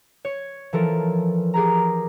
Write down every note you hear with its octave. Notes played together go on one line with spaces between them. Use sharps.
C#5
E3 F3 A4 A#4
G4 G#4 A#4 A#5